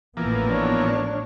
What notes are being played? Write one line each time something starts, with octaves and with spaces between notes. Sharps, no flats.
A1 A2 E3 F3 A#3 B3
D4 C#5